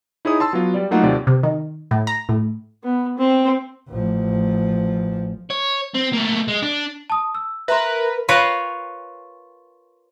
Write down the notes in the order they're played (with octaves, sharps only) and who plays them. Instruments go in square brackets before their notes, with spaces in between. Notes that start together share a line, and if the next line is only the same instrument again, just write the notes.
[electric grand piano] D#4 E4 G#4 C#5 D#6
A5 C6 E6
F#3 B3 F4
G3 D5
F#3 A3 A#3 D#4 F4 F#5
D#2 C3 F4 D5
[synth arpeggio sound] C3
D#3
A2
A#5
A2
[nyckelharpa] B3
C4
[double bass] A1 F3
[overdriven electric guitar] C#5
C4
A3 A#3
G#3
D4
[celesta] A5 D#6
E6
[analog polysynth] A#4 B4 [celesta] E5 A#5 C6
[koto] F4 A#4 B4 C#5 F5